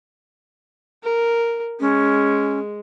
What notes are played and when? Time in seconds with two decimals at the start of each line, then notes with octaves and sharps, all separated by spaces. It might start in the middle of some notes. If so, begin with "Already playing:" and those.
1.03 A#4
1.80 G#3 C#4